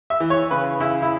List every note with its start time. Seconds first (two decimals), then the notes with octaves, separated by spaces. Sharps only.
0.10 E5
0.20 E3
0.30 C#5
0.51 C#3 B4
0.80 C#3 E4
1.02 E4